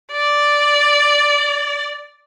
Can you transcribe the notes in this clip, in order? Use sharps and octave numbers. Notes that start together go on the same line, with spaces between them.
D5